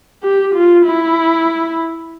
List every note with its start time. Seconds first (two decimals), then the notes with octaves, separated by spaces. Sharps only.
0.23 G4
0.54 F4
0.85 E4